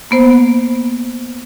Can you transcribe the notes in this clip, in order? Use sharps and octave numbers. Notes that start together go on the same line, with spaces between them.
A#3 B3 C5